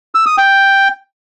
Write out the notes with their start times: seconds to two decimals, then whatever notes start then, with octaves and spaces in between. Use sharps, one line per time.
0.15 E6
0.26 D#6
0.38 G5